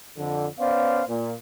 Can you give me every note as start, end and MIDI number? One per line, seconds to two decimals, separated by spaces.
0.18 0.47 41
0.18 0.47 50
0.59 1.02 59
0.59 1.02 61
0.59 1.02 72
0.59 1.02 74
0.59 1.02 77
1.09 1.34 46